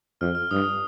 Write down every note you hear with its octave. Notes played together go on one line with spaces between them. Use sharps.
F2 F6
F6
G2 D#6